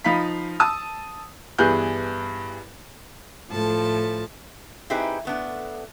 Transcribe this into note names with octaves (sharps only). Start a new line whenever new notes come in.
F3 D#4 F5 B5 B6
A5 D#6 E6
G2 E3 B3 G#4 F#6 G6
A2 F3 A4 A5
C4 D#4 E4 G4 G#4 B4
A3 B3 D4